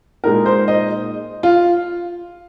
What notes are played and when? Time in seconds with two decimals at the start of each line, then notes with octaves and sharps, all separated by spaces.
0.24 A#2 G#3 D#4 A#4
0.46 C5
0.68 D#5
1.43 F4